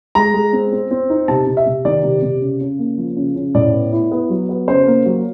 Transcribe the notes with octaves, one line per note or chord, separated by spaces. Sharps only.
G#3 A#5
G#3
C4
C4
C4
D#4
C3 A5
C3
E5
C3
D#3 D5
C3
C3
C#3
C#3
A#3
F3
C#3
C#3
A2 D5
B3
E4
B3
F#3
B3
C#3 C5
A#3
F#3